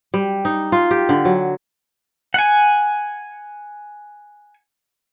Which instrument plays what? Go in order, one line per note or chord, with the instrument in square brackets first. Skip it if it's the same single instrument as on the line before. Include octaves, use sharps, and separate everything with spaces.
[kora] G3
D#4
F4
G4
D3
F#3
[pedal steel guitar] F#5 G#5